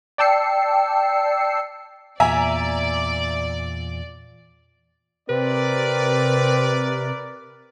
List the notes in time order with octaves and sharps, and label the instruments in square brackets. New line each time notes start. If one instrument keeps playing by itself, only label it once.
[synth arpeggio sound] D5 G5 A5 E6 C7 C#7
[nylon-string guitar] E2 A#2 [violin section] D5 [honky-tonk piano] E5 G#5 A#5
[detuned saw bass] C3 [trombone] C4 [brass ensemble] A#4 D5 [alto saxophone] B4